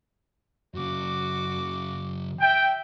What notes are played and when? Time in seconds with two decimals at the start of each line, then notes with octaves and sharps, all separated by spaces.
0.75 F#2 C#3 F#4 D6
2.41 E5 G5